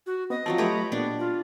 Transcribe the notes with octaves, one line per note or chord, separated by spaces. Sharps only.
F#4
B3 C4 D#5
F3 F#3 C4 A5
F#3 A3 G4 B4 C#5
A#2 B3 D4
F4